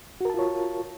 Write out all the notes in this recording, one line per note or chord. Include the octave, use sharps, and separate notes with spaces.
F4 F#4 A#4 C#5 A5